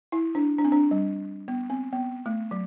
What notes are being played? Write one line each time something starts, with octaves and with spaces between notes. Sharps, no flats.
E4
D4
D4
C4
D4
G3
B3
C4
B3
A3
F#3